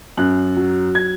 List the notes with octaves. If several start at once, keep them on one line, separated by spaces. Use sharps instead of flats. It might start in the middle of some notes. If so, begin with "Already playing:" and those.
F#2 F#6
F#3
G#6